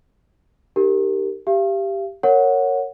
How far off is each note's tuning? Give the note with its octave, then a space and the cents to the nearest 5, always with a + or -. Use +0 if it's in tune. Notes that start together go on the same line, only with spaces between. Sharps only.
D#4 -10 G4 +0 A#4 -20
G4 +0 F5 -40
A#4 -15 C#5 +0 F#5 -10